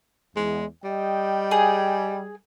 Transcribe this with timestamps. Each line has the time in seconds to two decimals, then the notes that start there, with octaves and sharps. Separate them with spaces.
0.36 E2 G#3
0.84 G3 D#5 G5
1.51 G#4